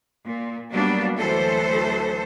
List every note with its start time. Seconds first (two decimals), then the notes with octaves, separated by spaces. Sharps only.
0.24 A#2
0.72 F#3 G3 A#3 B3 D4
1.17 D2 E3 F#3 A4 C5